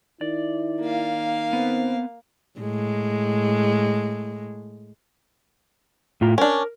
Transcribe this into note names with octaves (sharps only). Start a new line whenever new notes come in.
D#3 E4 D5
A#3 F5
B3 C4
A2 G#3
A2 F4 A#5
C#4 D4 A#4